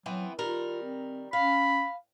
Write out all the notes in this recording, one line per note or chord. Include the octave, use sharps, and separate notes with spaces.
E3 F#3 B3 C4
D#3 G3 F4 A#4
C4
C#4 F5 B5